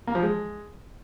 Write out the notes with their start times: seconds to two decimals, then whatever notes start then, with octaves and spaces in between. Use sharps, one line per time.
0.07 A#3
0.15 F3
0.22 G#3